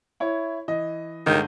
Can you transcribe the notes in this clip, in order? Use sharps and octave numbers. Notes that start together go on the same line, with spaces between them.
E4 C#5
E3 D#5
G1 D#3 G#3 G6